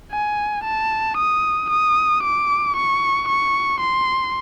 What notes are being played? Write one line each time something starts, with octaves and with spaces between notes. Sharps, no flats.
G#5
A5
D#6
D#6
D6
C#6
C#6
C6